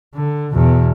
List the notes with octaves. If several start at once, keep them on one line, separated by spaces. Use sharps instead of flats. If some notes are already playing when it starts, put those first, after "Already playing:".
D3
E2 B2